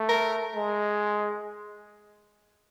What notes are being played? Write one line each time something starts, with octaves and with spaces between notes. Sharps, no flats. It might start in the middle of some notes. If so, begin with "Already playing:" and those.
Already playing: A3
A#4
G#3